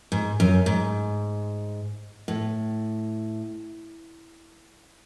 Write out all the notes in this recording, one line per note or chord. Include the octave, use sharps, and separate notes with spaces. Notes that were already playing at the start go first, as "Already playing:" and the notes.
G#2
F#2
G#2
A2